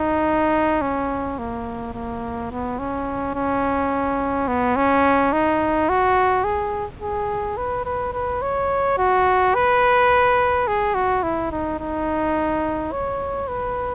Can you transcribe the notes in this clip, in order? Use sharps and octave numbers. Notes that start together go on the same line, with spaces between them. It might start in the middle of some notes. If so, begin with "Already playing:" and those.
Already playing: D#4
C#4
A#3
A#3
B3
C#4
C#4
B3
C#4
D#4
F#4
G#4
G#4
B4
B4
B4
C#5
F#4
B4
G#4
F#4
E4
D#4
D#4
C#5
B4